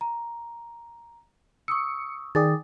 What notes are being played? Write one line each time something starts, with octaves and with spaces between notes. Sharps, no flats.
A#5
C#6 D#6 E6 C#7
D#3 G#4 D5 G5 D#6 A6